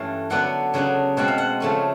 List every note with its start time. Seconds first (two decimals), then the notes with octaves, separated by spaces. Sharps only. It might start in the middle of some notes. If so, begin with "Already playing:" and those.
Already playing: G2 E3 A3 C#4 F5
0.30 D3 F#3 B3 D4 F#5
0.74 C#3 F#3 B3 D4
1.17 B2 G#3 C4 F#5
1.28 F5
1.38 F#5
1.60 C#3 F3 A3 C#4